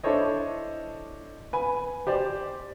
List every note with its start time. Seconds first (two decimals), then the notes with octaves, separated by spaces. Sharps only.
0.03 D4 E4 A4 C5 C#5 D#5
1.53 B4 G#5
2.07 G4 C5 D5